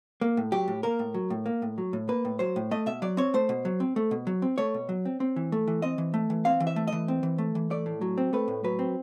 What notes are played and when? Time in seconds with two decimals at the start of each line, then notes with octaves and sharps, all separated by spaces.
0.21 A#3
0.37 A2
0.52 F#3 G4
0.68 A2
0.83 A#3 A#4
0.99 A2
1.14 F#3
1.30 A2
1.46 A#3
1.62 A2
1.78 F#3
1.93 A2
2.09 A#3 B4
2.25 A2
2.39 F#3 C5
2.56 A2
2.71 A3 D#5
2.86 B2 E5
3.02 F#3 D5
3.17 C4 C#5
3.34 A3 C5
3.49 B2
3.65 F#3
3.80 C4
3.96 A3
4.11 B2
4.27 F#3
4.42 C4
4.58 A3 C#5
4.74 B2
4.89 F#3
5.05 C4
5.20 C4
5.36 E3
5.52 A3
5.67 E3
5.82 C4 D#5
5.98 E3
6.14 A3
6.30 E3
6.45 C4 F5
6.60 E3
6.67 E5
6.76 A3
6.87 E3 D#5
7.08 C4
7.23 E3
7.38 A3
7.55 E3
7.70 A3 D5
7.86 A2
8.01 F#3
8.18 C4
8.33 A3 B4
8.48 A2
8.64 F#3 B4
8.79 C4